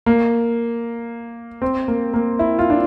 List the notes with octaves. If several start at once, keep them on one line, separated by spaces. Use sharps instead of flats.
A#3
C4
A#3
A#3
E4
F4
D4